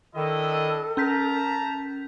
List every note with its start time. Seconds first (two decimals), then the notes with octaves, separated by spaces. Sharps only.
0.16 D#3 D4 E4 A4 D#5
0.97 C#4 A#4 A5 A#5 G6 B6